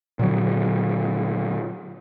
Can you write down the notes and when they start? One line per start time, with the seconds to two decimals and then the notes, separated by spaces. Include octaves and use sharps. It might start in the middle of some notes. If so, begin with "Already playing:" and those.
0.19 A#2 D3 F#3